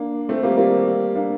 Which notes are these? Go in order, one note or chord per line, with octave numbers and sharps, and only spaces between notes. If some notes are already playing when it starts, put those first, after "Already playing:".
Already playing: A#3 D4
A3 C4
G3 A#3
G3 A#3
A#3 D4